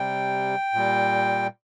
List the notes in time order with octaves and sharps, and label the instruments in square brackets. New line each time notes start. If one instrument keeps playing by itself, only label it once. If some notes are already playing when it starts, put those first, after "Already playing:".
Already playing: [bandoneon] C3 G3 G5
A#2 G3